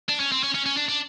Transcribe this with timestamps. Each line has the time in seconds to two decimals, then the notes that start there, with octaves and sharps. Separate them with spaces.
0.09 D4
0.20 C#4
0.32 C4
0.43 C#4
0.55 C#4
0.66 C#4
0.77 D4
0.89 D4